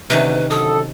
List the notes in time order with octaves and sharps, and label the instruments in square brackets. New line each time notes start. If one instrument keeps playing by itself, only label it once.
[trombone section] D2 [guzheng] C3 D#3 C#4 [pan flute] B4
[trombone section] F#2 D3 A4 [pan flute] D#6